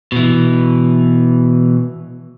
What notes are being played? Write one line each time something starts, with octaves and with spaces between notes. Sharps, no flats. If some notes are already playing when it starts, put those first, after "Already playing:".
B2 E3